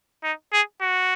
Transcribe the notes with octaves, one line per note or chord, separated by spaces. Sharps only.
D#4
G#4
F#4